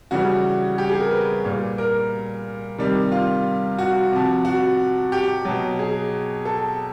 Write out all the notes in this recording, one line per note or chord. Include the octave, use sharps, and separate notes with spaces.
C#3 E3 G3 F#4
G4
G#4
A#4
B4
A#2 G3
A#4
C3 D#3 G3
F4
F#4
C3 F3
F#4
G4
B2 F#3
G#4
A4